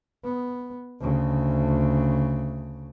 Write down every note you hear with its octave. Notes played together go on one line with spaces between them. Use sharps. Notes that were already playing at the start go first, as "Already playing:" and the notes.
B3
D2 C#3